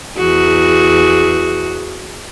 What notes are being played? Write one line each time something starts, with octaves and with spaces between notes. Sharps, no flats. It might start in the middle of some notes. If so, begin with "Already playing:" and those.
E2 F#4 G#4